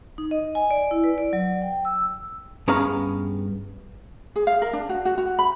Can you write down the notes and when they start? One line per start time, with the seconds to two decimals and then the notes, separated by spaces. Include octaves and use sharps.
0.18 D#4
0.31 D#5
0.55 G#5
0.71 D5
0.91 E4
1.04 B4
1.18 D5
1.33 F#3
1.62 G5
1.85 E6
2.68 G2 B3 C#4 G#4 F5 A#5
4.36 G#4
4.47 F5
4.62 A#4
4.73 D4
4.89 F#4
5.05 F#4
5.18 F#4
5.39 B5